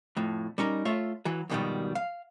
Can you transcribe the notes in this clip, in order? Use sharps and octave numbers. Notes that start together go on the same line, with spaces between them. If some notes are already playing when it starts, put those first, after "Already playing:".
F2 A2
G3 C#4 D#4 A#4
A3 F4 C#5 E5
E3 F#3
F2 G#2 B2 D#3 F#3 G3
F5